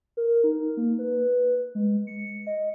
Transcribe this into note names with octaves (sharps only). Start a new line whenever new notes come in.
A#4
D#4
A#3
B4
G#3
C#7
D#5